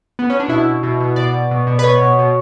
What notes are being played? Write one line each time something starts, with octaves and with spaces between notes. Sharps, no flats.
B3
C#4
D4
B2 E4
B2
B2
B2
B2 D5
B2
B2
B2
B4
B2 C#5
B2
B2